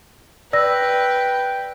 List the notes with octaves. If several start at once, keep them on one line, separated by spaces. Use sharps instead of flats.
B4 D5 G5 E6 A#6